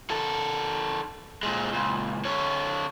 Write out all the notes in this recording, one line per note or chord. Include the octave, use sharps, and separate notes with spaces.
D#3 A4
A#2 G#3
C#2 A#2
D3 C#5